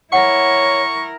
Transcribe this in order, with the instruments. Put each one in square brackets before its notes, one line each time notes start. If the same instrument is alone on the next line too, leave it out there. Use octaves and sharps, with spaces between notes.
[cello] E4 A#4 [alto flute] C#5 [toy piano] F#5 [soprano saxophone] C#6